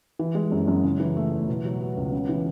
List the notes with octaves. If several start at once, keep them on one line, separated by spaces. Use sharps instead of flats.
E3
G#3
F#2
F#2
C#3
E3
A3
E2
B2
F#3
B3
C#2
C#3
E3